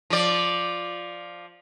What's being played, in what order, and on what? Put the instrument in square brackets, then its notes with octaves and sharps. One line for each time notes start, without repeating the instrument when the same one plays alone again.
[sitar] F3 D5